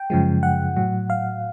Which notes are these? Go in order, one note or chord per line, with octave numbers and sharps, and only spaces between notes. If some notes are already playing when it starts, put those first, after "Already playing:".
Already playing: G5
F#2 C#3 F3 G#3
F#5
A2 F#3
F5